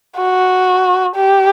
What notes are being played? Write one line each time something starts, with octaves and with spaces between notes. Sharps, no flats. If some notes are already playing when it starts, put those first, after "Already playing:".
F#4
G4